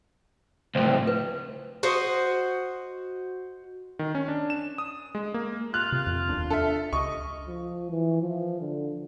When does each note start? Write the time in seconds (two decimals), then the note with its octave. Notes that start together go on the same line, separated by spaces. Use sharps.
0.75 C#2 A2 C4
1.07 B4
1.83 F#4 C5 D#5
3.99 D#3
4.15 C#4
4.28 D4
4.50 E7
4.78 D#6
5.15 G#3
5.34 A#3
5.74 F4 F#6
5.92 C3 F4
6.07 F2
6.29 E1 D#2 D4
6.50 D4 A4 E5
6.93 C#2 D#5 C#6
7.48 F3
7.90 E3
8.22 F3
8.61 D3